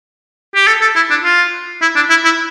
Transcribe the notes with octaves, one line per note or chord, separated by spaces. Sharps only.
G4
A4
A4
E4
D4
F4
E4
D4
E4
E4